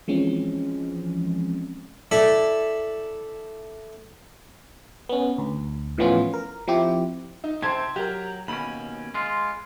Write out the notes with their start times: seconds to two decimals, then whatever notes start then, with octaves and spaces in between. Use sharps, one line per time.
0.08 E3 F3 G#3 C4 C#4
2.11 E4 A4 D5 E5 B5
5.09 B3 C#4
5.38 D2
5.98 A2 E3 F3 B3 C#4 F4
6.34 A#4
6.68 F3 C4 E4 G4
7.44 D#4
7.62 C3 C4 C5 A5 G#6
7.96 F#3 G4 A#4
8.48 D#2 B2 C#4 B5
9.14 G#3 F4